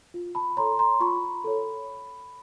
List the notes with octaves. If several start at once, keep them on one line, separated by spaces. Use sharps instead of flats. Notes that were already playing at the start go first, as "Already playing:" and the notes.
F4
A5 B5
A4 C#5 A#5 C6
A#5 C6
F4 B5 C#6
A4 C#5